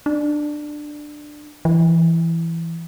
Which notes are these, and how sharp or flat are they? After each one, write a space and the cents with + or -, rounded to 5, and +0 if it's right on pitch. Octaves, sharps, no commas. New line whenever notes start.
D4 +15
E3 +10